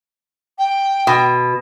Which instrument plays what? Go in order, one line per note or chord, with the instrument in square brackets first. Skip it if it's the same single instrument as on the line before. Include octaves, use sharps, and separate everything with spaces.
[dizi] G5
[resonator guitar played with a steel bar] B2